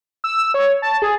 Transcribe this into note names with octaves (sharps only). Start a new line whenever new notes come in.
E6
C#5
A5
G#4